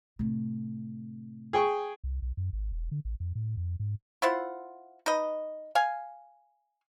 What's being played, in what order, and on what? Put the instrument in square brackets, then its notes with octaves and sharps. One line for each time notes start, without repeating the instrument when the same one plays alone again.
[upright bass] A2 C3
[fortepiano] G#4 G5 C#6
[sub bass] C2
B1
F#2
G#1
E1
D3
A1
F2
A2
F2
G#2
[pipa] E4 F4 C5 F#5
D#4 B4 D#5
F5 G#5